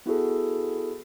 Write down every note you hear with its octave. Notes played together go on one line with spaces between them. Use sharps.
B3 E4 F#4 G#4 A4